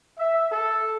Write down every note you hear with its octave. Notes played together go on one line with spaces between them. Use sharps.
E5
A4